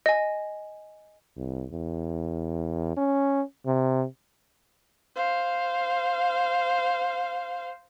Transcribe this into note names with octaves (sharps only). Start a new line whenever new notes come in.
D#5 G#5
C2
E2
C#4
C3
C5 F5